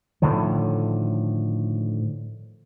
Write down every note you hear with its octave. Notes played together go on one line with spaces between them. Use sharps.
A2 D3 D#3 F3